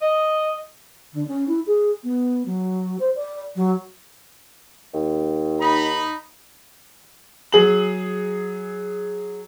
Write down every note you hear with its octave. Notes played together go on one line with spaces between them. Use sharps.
D#5
D3
C#4
E4
G#4
B3
F#3
C5
D5
F#3
D#2
D#4 B5
F#3 G#4 F#7